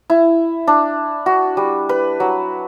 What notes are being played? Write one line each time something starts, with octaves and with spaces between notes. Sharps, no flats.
E4
D4
F#4
G3
B4
F#3